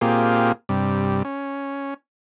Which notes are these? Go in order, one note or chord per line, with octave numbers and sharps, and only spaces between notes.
A#2 A#3 C4 F4 G4 G#4
G2 C3 G3
C#4